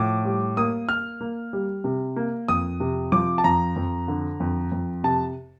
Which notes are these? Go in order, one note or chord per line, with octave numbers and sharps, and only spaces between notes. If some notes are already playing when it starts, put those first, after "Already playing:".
Already playing: A2 F3 D6
G3
A#3 D#6
A#3 F6
A#3
G3
C3
A#3
F2 D#6
C3
F3 D6
A5
F2 A#5
F2
D3
F2
F2
C3 A5